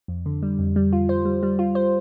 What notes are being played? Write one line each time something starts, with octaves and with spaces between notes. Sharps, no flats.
F2
D3
G3
F2
G3
F4
C5
G3
G3
F4
C5